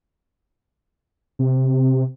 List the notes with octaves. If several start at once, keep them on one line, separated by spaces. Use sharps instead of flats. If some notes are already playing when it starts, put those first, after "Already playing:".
C3